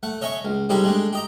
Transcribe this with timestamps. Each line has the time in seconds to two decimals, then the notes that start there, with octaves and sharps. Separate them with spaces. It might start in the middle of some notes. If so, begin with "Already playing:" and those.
0.03 A3 F#5
0.21 C#5 D#5 E5 G#5 C#6
0.45 C#2
0.69 C3 G3 G#3 D#4 G4 A4
0.84 G#3 A3 D4
1.13 G4 D#5 A#5